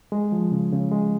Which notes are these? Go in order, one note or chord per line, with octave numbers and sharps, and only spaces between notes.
G#3
F3
C#3
C#3
G#3